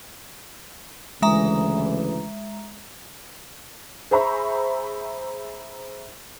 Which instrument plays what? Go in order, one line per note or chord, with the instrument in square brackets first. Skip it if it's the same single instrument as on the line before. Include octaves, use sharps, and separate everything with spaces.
[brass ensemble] D2 C#3 E3 [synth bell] G#3 E5 A#5
[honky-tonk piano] G#4 C5 E5 A#5 B5 C#6